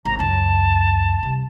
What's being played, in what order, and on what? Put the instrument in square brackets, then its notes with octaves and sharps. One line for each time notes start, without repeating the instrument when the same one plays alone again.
[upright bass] G#1 [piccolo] A#5
[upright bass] C#2 F#2 [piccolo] A5
[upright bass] C2